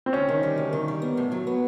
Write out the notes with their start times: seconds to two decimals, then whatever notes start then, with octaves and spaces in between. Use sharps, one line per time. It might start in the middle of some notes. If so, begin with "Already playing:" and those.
0.06 C4
0.13 D2 C#4
0.29 D#3
0.43 G3
0.58 D2
0.73 D#3
0.88 G3
1.02 B3
1.17 A2
1.32 F#3
1.47 B3